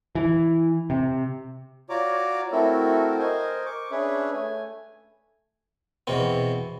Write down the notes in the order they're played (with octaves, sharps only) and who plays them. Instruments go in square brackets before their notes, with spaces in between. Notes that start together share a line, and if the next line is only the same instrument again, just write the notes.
[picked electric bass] E3
C3
[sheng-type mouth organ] F4 F#4 C#5 D5 A#5 D6
A3 C4 E4 F#4 A4 A#4
A#4 C5 D#5 G#5
C#6 D6
C#4 D4 G#4 B4 C#5 E5
A3 G#5
[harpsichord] E2 B2 C4